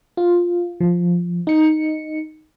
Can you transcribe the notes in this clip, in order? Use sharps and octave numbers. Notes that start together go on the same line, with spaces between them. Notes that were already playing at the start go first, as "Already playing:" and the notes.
F4
F3
D#4 C#7